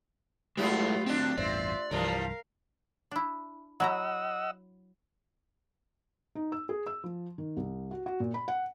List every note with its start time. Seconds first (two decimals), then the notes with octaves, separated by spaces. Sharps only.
0.57 F#3 G#3 A3 B3 E4 F4 G4 A4
1.06 F#3 C4 D4 G4
1.37 A1 E2 G2 C4 F4 D5 E5
1.91 C2 G2 E3 F3 G3 A#4 F5
3.11 D4 E4
3.80 F#3 E4 D#5 F#5 A#5 E6
6.35 D#4
6.52 E6
6.69 G#4
6.87 E6
7.04 F3
7.38 D#3
7.57 C2
7.91 F#4
8.06 F#4
8.20 A#2
8.34 B5
8.48 F#5